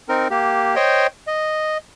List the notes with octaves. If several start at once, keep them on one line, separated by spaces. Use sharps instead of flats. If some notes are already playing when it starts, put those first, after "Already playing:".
C4 D#4 A#4
A#3 G4
C5 C#5 D#5 G5
D#5